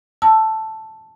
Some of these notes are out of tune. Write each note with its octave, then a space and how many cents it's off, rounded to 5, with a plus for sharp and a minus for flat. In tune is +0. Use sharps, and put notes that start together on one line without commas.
A5 +0 E6 +10